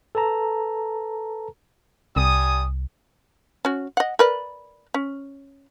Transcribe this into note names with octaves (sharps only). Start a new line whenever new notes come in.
A4 B4 A5 A#5
C2 G3 G#5 D#6
C#4 F#4
D#5 F#5
A#4 B4 D5
C#4